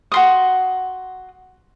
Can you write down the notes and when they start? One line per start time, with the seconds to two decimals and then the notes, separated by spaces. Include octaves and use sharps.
0.12 F#4 C6 D#6